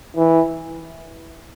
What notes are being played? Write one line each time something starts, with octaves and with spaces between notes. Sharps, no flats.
E3